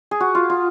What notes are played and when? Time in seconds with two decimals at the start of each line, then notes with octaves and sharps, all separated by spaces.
0.11 G#4
0.20 F#4
0.35 F4
0.50 F4